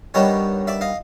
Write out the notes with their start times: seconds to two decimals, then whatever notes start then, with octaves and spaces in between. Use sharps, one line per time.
0.14 G2 D#3 G3 B3 D#4 C#5 D#5
0.67 D5 E5
0.81 D#5 F5